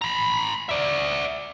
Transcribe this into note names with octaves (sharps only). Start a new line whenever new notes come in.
A#5 B5
D5 E5